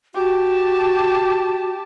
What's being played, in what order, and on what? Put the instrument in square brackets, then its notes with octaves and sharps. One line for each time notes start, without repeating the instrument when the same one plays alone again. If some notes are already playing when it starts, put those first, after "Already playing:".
[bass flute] F#4 [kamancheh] G4 A5